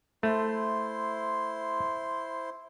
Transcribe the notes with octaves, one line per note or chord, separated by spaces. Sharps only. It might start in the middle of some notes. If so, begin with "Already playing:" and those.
A3 E4 C5 C6